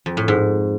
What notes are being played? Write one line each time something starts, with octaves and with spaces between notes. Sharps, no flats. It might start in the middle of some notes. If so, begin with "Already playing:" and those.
F2
A2
G#2